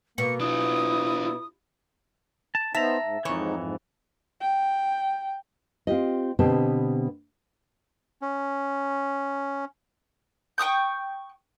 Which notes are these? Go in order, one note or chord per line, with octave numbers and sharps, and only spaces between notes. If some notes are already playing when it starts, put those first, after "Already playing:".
B2 A#3 C#7
D4 E4 F4 D#6
A5
B3 D#4 C5 E5 A5 A#5
G#2
F2 G#2 E3 D#4 C#5
G#2
G5
C4 F4 G4 D#5
B2 D3 B3 C4 G4 A5
C#4
G5 C#6 D#6 G6